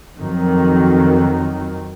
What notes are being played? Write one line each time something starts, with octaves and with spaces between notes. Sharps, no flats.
F2 D#3 F#3